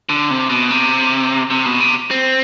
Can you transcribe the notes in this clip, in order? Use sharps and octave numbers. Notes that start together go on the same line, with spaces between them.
D3
C3
B2
C3
C3
B2
C3
C4